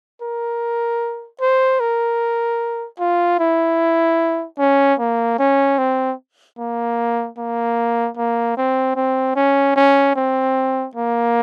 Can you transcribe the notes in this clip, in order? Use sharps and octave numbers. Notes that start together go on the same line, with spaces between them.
A#4
C5
A#4
F4
E4
C#4
A#3
C#4
C4
A#3
A#3
A#3
C4
C4
C#4
C#4
C4
A#3